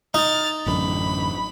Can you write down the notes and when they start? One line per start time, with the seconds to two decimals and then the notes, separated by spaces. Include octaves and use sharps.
0.14 D#4 F6 A6
0.66 A1 F#2 D3 B5